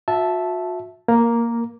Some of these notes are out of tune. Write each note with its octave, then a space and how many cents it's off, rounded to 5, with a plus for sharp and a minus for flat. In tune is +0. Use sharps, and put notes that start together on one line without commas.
F#4 -40 E5 +0 A5 -10
A#3 +0 A#4 +10 A#5 +0